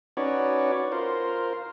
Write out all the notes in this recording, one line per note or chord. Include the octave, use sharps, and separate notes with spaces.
C#4 D#4 F#4 B4 C#5 D5
F4 A#4 C5